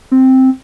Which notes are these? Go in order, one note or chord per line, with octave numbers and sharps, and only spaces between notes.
C4